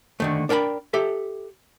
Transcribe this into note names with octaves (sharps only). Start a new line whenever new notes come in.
D3 D#3 A3
D4 A#4 G5 G#5 B5
G4 A4 E5